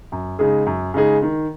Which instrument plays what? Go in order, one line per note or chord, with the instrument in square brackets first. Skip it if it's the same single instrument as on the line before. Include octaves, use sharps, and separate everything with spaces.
[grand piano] F#2
C#3 G#3 D#4 G#4
F#2
C#3 G#3 D#4 G#4
D#3